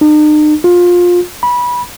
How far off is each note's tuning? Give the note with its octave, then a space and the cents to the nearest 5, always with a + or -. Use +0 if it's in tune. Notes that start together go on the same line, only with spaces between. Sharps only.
D#4 -45
F4 +20
B5 -20